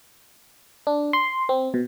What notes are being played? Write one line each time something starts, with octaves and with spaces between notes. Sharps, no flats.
D4
C6
C4
B2